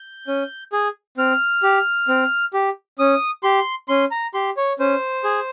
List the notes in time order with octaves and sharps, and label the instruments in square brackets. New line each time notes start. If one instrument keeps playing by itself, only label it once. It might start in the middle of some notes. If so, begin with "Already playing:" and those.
Already playing: [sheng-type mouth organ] G6
C#4
G#4
C4 F6
G4
C4
G4
C#4 D#6
G4 C6
C#4 C6
A#5
G4 C6
C#5
C#4 C5
G#4